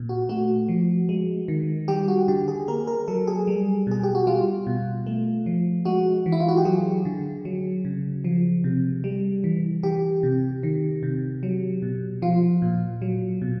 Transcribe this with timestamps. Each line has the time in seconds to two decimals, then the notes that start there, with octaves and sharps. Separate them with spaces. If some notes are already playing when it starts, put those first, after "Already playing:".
Already playing: A#2
0.09 F#4
0.29 A3 F#4
0.68 F3
1.09 G#3
1.48 D#3
1.88 G3 G4
2.08 F#4
2.28 D3 G4
2.48 G#4
2.68 A#3 A#4
2.87 A#4
3.08 F#3 A4
3.27 G#4
3.47 G3
3.87 B2 G#4
4.03 G4
4.15 F#4
4.27 G3 F4
4.67 B2
5.06 A3
5.46 F3
5.85 G#3 F#4
6.26 E3
6.32 E4
6.40 F4
6.48 F#4
6.57 G4
6.65 F#3 G#4
7.05 D3
7.45 F#3
7.85 C#3
8.24 F3
8.64 C3
9.04 G3
9.44 E3
9.83 E3 G4
10.23 C3
10.63 D#3
11.03 C3
11.43 F#3
11.82 B2
12.22 F3 F4
12.62 A#2
13.02 F#3
13.42 B2